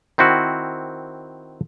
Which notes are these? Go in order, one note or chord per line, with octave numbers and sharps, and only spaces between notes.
D#3 C4 E4 F#4